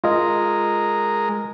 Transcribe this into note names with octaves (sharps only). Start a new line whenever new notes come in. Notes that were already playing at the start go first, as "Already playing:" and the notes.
G#3 F4 A#4 D#5